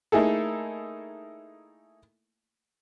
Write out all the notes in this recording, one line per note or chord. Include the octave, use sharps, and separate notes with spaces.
A3 A#3 D#4 E4 G#4 A4